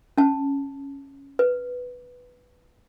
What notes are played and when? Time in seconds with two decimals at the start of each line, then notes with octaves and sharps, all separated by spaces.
0.18 C#4 A5
1.39 B4